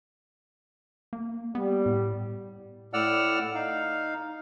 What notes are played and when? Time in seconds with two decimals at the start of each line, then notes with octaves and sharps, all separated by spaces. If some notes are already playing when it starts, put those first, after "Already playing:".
1.13 A#3
1.55 G3 B3
1.86 A2
2.93 A2 D5 F#5 E6 F6
3.55 D#4 F5